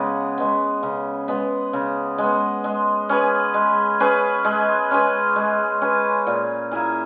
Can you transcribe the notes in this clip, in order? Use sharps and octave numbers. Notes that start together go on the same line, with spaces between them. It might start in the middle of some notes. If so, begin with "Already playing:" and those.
Already playing: C#3 G#3 B3
G#3 B3
C#3
G#3 B3
C#3
G#3 B3
G#3
C#4 G#4 B4
G#3
C#4 G#4 B4
G#3
C#4 G#4 B4
G#3
C#4 G#4 B4
A#2
A#3 E4 G#4